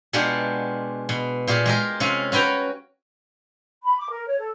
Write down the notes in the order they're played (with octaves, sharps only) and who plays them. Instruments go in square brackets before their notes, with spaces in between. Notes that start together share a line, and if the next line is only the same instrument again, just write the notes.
[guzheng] B2 G#3 D4 F4 G4 F#5
B2
A#2 F4 G4 G#4
G#3 G4 A#4
C3 C#4 F4
C#4 F#4 B4 G5 A#5
[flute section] B5
D6
A#4
C#5
A4